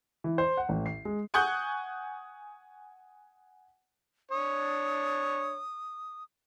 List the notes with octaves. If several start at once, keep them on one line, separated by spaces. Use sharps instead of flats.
E3
C5
F#5
A1
C7
G#3
F#5 G#5 C#6 D#6 F#6 G6
D4 C#5 D#6